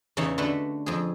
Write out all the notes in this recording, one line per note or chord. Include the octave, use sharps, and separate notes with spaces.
E2 C#3 E3 D#4 C#5 E5
D3 A3 F#4 B4
F2 G#4